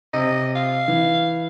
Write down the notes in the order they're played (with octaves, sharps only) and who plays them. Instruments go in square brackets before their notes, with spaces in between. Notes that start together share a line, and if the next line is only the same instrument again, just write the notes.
[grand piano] C3 [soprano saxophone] D#5
[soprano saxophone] F5
[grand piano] E3